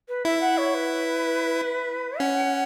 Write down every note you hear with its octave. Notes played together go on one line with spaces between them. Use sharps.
B4
E4 E5
F#5
C#5
B4
C#4 F#5